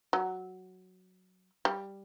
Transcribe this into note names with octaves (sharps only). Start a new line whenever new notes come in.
F#3
G3